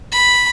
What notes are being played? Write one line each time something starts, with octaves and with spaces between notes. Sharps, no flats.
B5